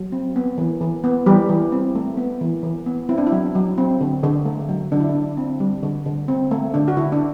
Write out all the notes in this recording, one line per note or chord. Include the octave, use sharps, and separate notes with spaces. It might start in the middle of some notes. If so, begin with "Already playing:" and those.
Already playing: F#3
C4
B3
E3
E3
B3
E3 G3 G4
E3
C4
A3
B3
E3
E3
B3
C4 E4
D4
E4
F#3
F#3
C4
D3
D3
A3
F#3
D3 D4
E4
D4
D3
C4
G3
D3
D3
C4
A3
D3 D4
F#4
D3 E4
D4